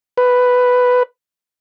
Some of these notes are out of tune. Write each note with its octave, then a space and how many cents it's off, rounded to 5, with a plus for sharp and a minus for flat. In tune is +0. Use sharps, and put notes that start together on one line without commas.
B4 +5